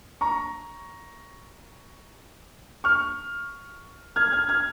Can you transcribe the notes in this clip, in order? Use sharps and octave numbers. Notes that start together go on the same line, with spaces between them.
A#5 C#6
C#6 F6
F6 G#6
F6 G#6
F6 G#6